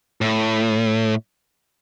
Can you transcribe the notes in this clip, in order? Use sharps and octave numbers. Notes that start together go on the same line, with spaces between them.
A2